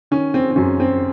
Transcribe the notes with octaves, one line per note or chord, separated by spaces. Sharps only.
D#3 C#4
C4
C4
F#2 C#4
C4